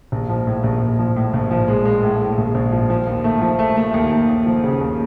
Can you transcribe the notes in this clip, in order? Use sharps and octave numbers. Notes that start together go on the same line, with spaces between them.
A#1
F3
A2
A#1
A#1
F3
A2
A#1
F3
G#3
G#3
A2
A2
A#1
A#1
F3
F3
D#2
A3
F3
A3
A3
D#2
D#2
D#2
F3
C#3
D#2